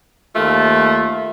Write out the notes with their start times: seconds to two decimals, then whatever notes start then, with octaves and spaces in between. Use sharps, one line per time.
0.36 D#2 A3 F4